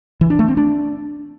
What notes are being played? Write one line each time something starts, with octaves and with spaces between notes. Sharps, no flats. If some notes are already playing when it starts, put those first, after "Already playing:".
E3
D4
A3
C4
D4